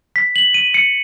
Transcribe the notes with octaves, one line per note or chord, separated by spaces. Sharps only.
B6
F#7
D#7
C#7